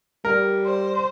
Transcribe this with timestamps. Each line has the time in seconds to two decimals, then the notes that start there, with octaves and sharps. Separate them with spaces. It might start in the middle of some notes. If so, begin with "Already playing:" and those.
0.25 G3 A#4
0.66 C5